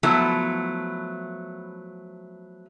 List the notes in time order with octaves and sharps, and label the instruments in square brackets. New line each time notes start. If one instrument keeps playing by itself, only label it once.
[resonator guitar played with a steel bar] F3 F#3 A3 B3 E4